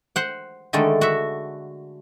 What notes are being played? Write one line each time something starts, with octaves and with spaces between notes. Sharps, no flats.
C5 F#5
D3 D#3 G#3 A3
F#4 E5